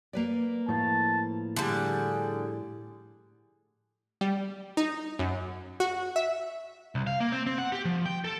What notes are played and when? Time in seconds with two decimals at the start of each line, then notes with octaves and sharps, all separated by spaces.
0.13 A#3 B4 D5
0.69 A2 F3 A5
1.56 D3 G3 G#4
4.21 G3
4.77 D#4
5.19 F#2
5.80 F#4
6.16 E5
6.95 C2
7.07 F5
7.20 A#3
7.32 C4
7.47 C4
7.58 F#5
7.72 G4
7.85 F3
8.06 G5
8.25 A4